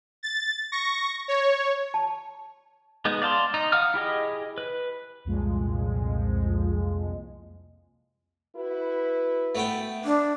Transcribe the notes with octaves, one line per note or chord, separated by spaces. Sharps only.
A6
C#6 A#6
C#5
A5
G#3 B3 D#4
D5 F5 A5 C6
D#4
F5 F#5 D#6 F6
E4 G4 G#4 D#5
B4
C2 F2 A#2 F3 G#3
E4 F#4 B4
A3 B3 G5
D4